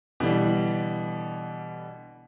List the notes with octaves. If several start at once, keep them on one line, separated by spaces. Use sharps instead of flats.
B2 D3 E3 G3